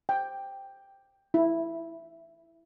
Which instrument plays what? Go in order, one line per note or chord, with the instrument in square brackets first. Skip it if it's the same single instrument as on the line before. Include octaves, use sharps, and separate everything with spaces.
[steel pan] G5
E4